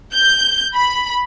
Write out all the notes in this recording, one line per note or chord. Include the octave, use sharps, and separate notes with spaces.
G6
B5